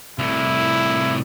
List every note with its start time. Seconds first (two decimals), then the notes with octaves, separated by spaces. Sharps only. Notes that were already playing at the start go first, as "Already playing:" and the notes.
0.19 C2 A2 E4